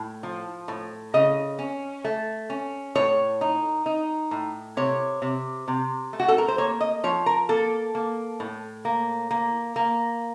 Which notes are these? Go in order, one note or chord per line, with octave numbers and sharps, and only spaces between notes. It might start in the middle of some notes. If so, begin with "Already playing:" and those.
Already playing: A2
F3
A2
C#3 D#5
C#4
A3
C#4
A2 C#5
D#4
D#4
A2
C3 C#5
C3
C3
A3
F#4
A4
A#4
C5
A#3 C#5
D#5
F3 C#5
A#4
A#3 A4
A#3
A2
A#3
A#3
A#3